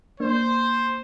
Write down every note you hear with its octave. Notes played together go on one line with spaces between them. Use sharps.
A#3 D4 C5